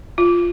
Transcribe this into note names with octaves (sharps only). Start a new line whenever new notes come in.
F4